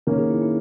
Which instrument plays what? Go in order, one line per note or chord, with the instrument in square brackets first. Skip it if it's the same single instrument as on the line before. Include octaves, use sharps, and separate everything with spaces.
[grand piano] D#3 A#3 C#4 [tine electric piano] A#4
[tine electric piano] G#4
E4
E4